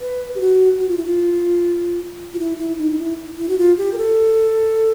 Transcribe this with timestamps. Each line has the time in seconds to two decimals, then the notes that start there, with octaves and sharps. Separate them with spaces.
0.01 B4
0.35 G4
0.40 F#4
0.80 F#4
0.89 F4
0.97 E4
1.06 F4
2.34 F4
2.39 E4
2.59 E4
2.79 D#4
2.92 D#4
2.99 E4
3.38 E4
3.49 F#4
3.58 F4
3.78 G4
3.93 A#4
3.97 A4